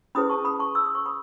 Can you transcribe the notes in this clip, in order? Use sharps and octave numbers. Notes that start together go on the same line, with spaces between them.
C#4 E4 G#4 B4 B5 D#6
A5 C#6
B5 D#6
A5 C#6
E6
D#6
C#6
B5 D#6